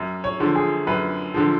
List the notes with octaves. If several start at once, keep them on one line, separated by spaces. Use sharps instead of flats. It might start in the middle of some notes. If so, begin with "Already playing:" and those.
Already playing: F#2
C#5
D3 F3
G#4
F#2 B4
D3 F3